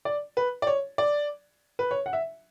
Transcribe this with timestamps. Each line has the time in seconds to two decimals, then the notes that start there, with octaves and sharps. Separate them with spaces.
0.05 D5
0.37 B4
0.62 D5
0.67 C#5
0.98 D5
1.79 B4
1.91 C#5
2.06 F#5
2.13 E5